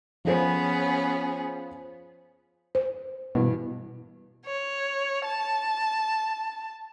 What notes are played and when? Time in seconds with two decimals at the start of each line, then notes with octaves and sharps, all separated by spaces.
0.25 F3 B3 C#4 G#4 C5
2.75 C5
3.35 G2 B2 E3
4.46 C#5
5.25 A5